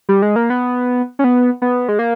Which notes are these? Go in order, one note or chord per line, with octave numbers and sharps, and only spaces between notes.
G3
G#3
A#3
B3
C#4
B3
B3
G#3
A#3